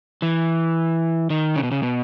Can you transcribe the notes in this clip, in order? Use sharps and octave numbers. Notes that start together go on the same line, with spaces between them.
E3
D#3
C#3
B2
C#3
B2